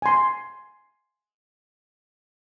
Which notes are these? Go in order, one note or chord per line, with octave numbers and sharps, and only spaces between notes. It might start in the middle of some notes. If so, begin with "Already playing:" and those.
G#5 C6